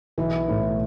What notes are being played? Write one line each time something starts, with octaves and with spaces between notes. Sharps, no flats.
B1 B2 E3
A2